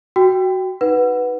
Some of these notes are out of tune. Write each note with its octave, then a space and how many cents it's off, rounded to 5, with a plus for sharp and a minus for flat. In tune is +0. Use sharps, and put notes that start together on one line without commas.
F#4 +10 G5 +0
D#4 +0 B4 +0 F#5 +0